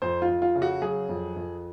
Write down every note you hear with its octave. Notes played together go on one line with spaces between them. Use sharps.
F2 C5
F4
F2
F4
C#3
F#4
F#3 G#4
F2
F2